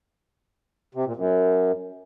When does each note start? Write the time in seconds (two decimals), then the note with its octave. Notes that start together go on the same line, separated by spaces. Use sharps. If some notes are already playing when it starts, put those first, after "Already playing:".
0.95 C3
1.06 A#2
1.17 F#2